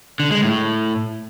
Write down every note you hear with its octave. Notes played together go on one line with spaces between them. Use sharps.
D3
G#3
A2